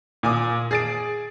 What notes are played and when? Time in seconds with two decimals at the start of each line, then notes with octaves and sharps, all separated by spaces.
0.23 A#2 G#5 D6 D#6
0.71 G#4 A6 D7